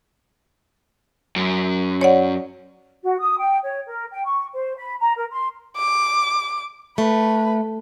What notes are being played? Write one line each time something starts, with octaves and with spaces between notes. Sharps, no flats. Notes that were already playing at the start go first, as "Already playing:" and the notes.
F#2
C#5 D5 F#5
F#4
D#6
G5
C#5
A#4
G5
C#6
C5
B5
A#5
A#4
C6
D6
A3 B4